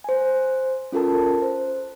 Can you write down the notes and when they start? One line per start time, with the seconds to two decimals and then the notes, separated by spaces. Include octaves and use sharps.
0.04 C5 G#5
0.92 C#4 F4 A4 A#4 A5
1.42 C5